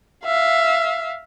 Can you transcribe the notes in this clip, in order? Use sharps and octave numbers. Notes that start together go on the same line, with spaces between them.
E5 F5